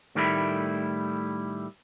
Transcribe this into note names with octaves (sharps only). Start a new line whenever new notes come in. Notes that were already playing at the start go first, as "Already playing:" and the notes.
A2 D#3 G3 A3 E4